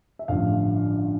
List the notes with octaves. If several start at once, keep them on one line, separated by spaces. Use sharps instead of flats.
E5
A1 G2 D3 F3 F5